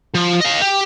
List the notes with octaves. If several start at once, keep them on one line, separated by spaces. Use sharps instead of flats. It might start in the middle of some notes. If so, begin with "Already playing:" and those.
F3
D#5 F5
G4